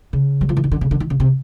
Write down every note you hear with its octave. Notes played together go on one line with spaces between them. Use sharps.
C#3
F#3
F3
E3
D#3
D3
C#3
D3
D#3
C#3
C3